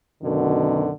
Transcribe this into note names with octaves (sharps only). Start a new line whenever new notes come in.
F#2 B2 D3 D#3